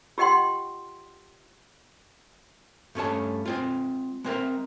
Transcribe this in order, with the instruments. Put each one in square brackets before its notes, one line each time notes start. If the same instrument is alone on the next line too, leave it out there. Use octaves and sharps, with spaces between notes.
[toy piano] F4 G4 D#5 F#5 G5 C6
[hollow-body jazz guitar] G2 A3 C#4 A5
G#3 C4 F4
G#3 C4 A#4 E5